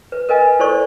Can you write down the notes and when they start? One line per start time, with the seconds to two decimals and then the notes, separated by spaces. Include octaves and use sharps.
0.12 B4
0.29 A#4 B4 D#5 F5 G#5
0.59 E4 A4 C5 D5 C#6